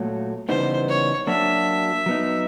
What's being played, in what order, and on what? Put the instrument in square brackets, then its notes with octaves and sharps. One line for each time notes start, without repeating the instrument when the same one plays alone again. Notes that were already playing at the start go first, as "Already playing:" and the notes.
Already playing: [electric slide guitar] A#2 F#3 A3
[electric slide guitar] C#3 E3 G3 B3 D#4 [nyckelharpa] C5
[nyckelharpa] C#5
[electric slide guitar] F#3 A#3 D4 F#4 [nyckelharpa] E5
[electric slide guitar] F#3 B3 D#4